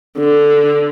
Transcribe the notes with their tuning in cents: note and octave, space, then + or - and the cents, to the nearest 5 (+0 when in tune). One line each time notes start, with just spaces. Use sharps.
D3 +0